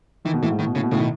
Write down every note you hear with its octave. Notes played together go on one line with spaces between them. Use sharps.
D#3 E3
B2
A2 E3
G#2
A2 D#3
B2
A2 C#3
B2
A2 C#3
B2 D#3